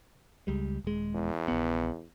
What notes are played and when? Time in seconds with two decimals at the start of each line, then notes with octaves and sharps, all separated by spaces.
0.47 C#2 G3 G#3
0.84 D#1 G#3
1.15 E2
1.48 A#1 B3